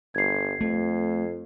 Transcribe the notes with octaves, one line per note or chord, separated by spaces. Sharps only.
G1 G#6 C7
F2 A3